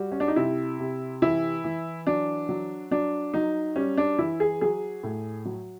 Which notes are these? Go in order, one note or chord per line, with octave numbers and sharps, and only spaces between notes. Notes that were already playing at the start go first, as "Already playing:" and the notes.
Already playing: G3 F#4
C#4
D4
D#4
C3 E4
C3
E3 E4
E3
F#3 D4
F#3
F#3 D4
F#3 D#4
G3 C#4
D4
E3 E4
G#4
F#3 G#4
A2
F#3